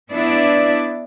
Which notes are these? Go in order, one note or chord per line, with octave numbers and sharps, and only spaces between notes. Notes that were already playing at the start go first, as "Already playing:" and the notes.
B3 D4 E4 D5